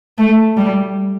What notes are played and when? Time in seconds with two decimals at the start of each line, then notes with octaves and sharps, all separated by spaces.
0.18 A3
0.57 G3